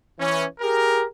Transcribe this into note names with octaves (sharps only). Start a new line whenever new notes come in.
E3 C#4
G4 G#4 A#4